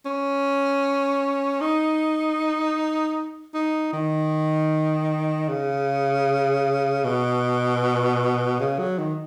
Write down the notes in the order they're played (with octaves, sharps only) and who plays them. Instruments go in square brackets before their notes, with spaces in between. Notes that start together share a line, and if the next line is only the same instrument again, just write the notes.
[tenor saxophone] C#4
D#4
D#4
D#3
C#3
B2
C#3
F#3
D#3